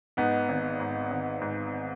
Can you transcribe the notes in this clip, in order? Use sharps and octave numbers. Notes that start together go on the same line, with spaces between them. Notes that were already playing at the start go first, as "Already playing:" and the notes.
G#2 B3 D#4
G#1
G#2
G#1
G#2